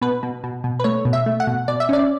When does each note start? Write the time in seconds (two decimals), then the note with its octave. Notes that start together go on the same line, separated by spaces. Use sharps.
0.02 B2 B4
0.23 B2
0.44 B2
0.64 B2
0.80 B4
0.84 A3 C#5
1.05 B2
1.13 E5
1.26 A3
1.40 F#5
1.47 B2
1.68 B2 D5
1.80 E5
1.89 C#4 D5